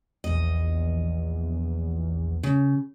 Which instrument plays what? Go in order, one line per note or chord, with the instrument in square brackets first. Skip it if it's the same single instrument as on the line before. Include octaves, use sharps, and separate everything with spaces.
[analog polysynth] A#1 E2 [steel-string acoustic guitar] D#5
[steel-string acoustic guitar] C#3